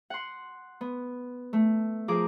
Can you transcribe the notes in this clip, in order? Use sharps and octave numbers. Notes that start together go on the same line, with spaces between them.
F#5 C6
B3
A3
F3 G#4 A#4 D6